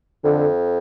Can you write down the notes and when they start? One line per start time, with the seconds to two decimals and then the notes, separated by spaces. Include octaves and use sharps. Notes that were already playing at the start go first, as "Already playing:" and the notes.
0.24 F2 D3